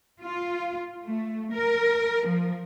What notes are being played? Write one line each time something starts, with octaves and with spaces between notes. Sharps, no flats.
F4
A3
A#4
F3